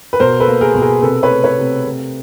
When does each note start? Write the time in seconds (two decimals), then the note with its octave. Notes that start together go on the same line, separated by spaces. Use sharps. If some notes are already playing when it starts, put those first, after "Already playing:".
0.13 B4
0.20 B2 A#4 C5
0.40 A4 B4
0.48 A#3
0.61 G#4 A#4
0.75 B2
0.81 G#4 A#4
1.02 C3 A4 B4
1.23 B4 C#5
1.30 A3
1.44 B4 C#5
1.58 C3
1.86 C3